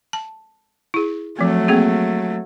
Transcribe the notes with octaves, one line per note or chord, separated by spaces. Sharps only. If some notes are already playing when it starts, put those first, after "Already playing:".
A5
E4 G#4
F3 F#3 A3 C4
A#3 C4 G#4